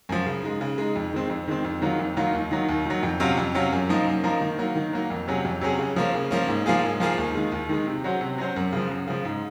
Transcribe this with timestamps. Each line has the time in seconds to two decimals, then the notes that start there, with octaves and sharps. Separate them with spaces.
0.09 F#2 F3
0.26 C#3
0.43 G#3 D#4
0.61 C#3
0.78 G#3 D#4
0.96 F2
1.13 D#3 G#3 C4
1.30 F2
1.48 D#3 G#3 C4
1.65 F2
1.82 D#3 F#3 A#3 F4
1.99 F2
2.17 D#3 F#3 A#3 F4
2.33 D#2
2.51 D#3 F#3
2.69 D#2
2.85 D#3 F#3
3.03 F2
3.20 C3 F#3 C#4 F4
3.37 F2
3.55 C3 F#3 C#4 F4
3.72 F#2
3.89 F3 A#3 D#4 A#4
4.07 F#2
4.24 F3 A#3 D#4 A#4
4.41 D#3
4.58 F#3 A#3
4.75 D#3
4.93 F#3 A#3
5.10 F2
5.28 C3 F#3 C#4 G#4
5.45 F2
5.61 C3 F#3 C#4 G#4
5.79 C#3
5.96 F3 A#3 C#4
6.14 C#3
6.31 F3 A#3 C#4
6.48 G#2
6.66 F3 A#3 F4 G#4
6.83 G#2
7.00 F3 A#3 F4 G#4
7.18 D#2
7.35 D#3 G#3
7.52 D#2
7.69 D#3 G#3
7.87 C3
8.04 F#3 C#4 F#4 C5
8.21 C3
8.38 F#3 C#4 F#4 C5
8.56 F#2
8.73 C#3 F3
8.90 F#2
9.08 C#3 F3
9.25 G#2